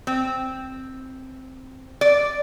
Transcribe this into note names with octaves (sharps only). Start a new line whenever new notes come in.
C4
D5